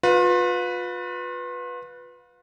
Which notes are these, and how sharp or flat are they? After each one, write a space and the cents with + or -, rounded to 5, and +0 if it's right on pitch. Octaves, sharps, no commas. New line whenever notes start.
F4 +35 B4 +0